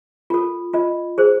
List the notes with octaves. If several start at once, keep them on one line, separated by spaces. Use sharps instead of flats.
F4 A4
F4 D#5
G#4 C5